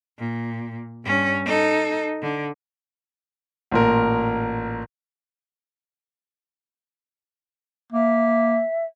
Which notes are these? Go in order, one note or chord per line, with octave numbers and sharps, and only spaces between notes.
A#2
G2 C#4
D#4 A4
D3
A1 A#2 A#4
A#3 E5